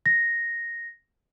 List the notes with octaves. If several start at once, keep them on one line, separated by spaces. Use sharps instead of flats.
A#6